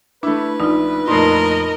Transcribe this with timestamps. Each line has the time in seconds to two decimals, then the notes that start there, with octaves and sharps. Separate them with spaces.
0.23 A3 D4 E4 B4
0.60 A#1 D#4 F4
1.08 F2 A#2 A3 D#4 A#4 D#5 C6